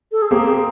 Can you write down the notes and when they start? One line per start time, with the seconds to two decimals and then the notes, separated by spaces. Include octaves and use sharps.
0.12 A4
0.22 G#4
0.31 A#3 C4 G4
0.47 G#4